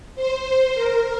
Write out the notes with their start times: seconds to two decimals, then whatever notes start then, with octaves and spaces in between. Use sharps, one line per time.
0.15 C5
0.74 A#4